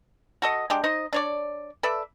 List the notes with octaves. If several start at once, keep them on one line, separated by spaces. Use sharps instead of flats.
F#4 A4 D#5
G#3 D4 G4
D#4 C5 D#5
D4 C#5 D5
A4 B4 D5 E5